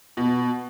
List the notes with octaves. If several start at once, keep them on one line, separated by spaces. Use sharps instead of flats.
B2